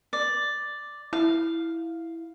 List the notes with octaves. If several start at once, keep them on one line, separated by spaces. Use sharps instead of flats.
D5
E4 F5